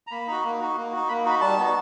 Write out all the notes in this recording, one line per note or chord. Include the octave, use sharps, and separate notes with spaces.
A#5
A#3 B5
D#4 F#4
A#3
D#4 F#4
A#3
D#4 F#4
A#3 B5
D#4 F#4 B5
G3 A5
B3 D#4 F#4